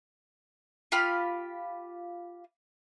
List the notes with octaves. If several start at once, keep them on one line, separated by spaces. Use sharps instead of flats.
F4 G4 B5 F6